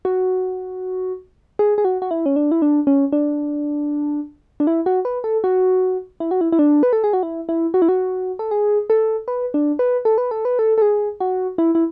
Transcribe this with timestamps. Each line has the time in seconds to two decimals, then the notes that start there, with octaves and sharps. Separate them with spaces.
0.05 F#4
1.59 G#4
1.78 G#4
1.85 F#4
2.02 F#4
2.11 E4
2.26 C#4
2.36 D4
2.52 E4
2.62 D4
2.87 C#4
3.12 D4
4.60 D4
4.67 E4
4.86 F#4
5.05 B4
5.24 A4
5.44 F#4
6.20 E4
6.31 F#4
6.41 E4
6.52 E4
6.59 D4
6.83 B4
6.93 A4
7.04 G#4
7.13 F#4
7.23 E4
7.49 E4
7.74 F#4
7.82 E4
7.89 F#4
8.39 A4
8.51 G#4
8.90 A4
9.28 B4
9.54 D4
9.79 B4
10.05 A4
10.18 B4
10.31 A4
10.45 B4
10.59 A4
10.78 A4
10.82 G#4
11.20 F#4
11.58 E4
11.75 E4